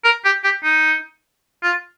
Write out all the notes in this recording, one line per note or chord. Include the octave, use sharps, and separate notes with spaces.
A#4
G4
G4
D#4
F4